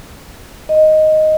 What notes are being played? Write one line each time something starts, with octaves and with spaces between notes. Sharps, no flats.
D#5